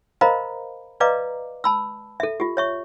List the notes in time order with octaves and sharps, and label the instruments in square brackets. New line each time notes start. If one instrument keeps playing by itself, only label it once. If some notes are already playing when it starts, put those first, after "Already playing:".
[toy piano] A#4 C5 D#5 F5 A#5 B5
B4 D5 D#5 F5 A#5 D6
A5 B5 E6
A4 E5
F4 G4
C#5 E5 C#6